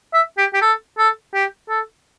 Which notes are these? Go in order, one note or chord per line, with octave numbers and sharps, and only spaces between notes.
E5
G4
G4
A4
A4
G4
A4